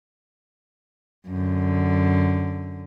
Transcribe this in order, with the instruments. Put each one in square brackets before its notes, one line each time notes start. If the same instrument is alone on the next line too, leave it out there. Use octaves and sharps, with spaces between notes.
[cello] F#2 D3